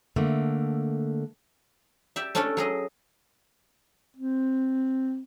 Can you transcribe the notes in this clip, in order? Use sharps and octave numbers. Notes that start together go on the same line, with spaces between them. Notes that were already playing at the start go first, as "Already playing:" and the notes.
D3 A3 A#3
G4 D5 E5
A3 C#4 D4 E4 A4
F#3 G#4 D#5
C4